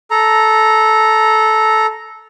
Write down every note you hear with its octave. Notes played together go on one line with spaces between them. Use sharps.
A4 A#5